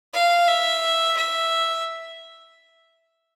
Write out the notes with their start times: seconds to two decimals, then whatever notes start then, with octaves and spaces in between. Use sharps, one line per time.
0.14 F5
0.48 E5
1.17 E5